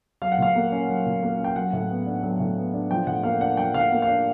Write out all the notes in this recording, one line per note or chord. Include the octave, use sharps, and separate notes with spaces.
F#3 F5
F#5
A#2 F5
A#3
C#4
F#3
A#2
A#3
C#4
G5
F#3 F#5
A2
B3
D4
F#3
A2
B3
D4
F3 G5
A2 F#5
A#3 F5
D4 F#5
F3 G5
A2 F5
F#5
A#3
F5
D4